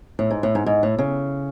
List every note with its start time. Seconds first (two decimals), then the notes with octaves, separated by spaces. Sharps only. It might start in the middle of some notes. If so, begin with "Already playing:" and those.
0.19 A2
0.30 G#2
0.43 A2
0.55 G#2
0.66 G#2
0.83 A2
0.99 C#3